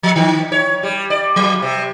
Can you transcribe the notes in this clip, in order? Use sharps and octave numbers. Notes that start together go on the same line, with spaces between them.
F3
D#3
C#5
G3
D5
F#3
C3